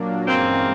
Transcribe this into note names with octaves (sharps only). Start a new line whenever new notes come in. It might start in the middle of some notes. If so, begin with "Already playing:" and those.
Already playing: A#2 F#3 A#3 D4
G2 E3 G#3 A#3 C4 C#4